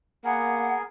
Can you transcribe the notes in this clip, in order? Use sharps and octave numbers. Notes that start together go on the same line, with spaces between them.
A#3 B3 G#4 A#4 F#5